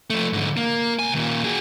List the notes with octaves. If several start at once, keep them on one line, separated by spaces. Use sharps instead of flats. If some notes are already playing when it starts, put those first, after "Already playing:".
F3 A3
G#2 D3
A#3
C2 G#5
D#2 A#2
F#4 G#4